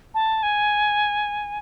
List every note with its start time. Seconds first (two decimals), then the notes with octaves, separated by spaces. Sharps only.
0.14 A5
0.43 G#5